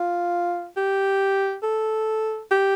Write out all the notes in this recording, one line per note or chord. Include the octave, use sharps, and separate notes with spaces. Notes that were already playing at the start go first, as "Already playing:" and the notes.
Already playing: F4
G4
A4
G4